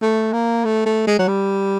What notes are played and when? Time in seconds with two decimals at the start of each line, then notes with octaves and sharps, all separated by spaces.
0.02 A3
0.33 A#3
0.65 A3
0.86 A3
1.07 G#3
1.19 F#3
1.28 G3